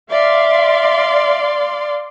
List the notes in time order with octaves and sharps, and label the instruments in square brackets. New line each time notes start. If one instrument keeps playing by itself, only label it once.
[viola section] D5 F5 C6 [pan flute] E5